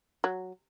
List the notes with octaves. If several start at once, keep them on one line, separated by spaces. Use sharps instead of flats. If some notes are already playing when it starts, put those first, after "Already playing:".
F#3